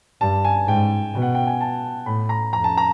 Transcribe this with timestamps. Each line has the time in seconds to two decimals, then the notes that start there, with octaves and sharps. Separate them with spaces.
0.21 G2 A5
0.45 G#5
0.67 G#2 G5
1.14 B2
1.22 F#5
1.35 G5
1.47 G#5
1.61 A5
2.06 A2 B5
2.29 A#5
2.53 F2 A#5
2.64 A5
2.77 A#5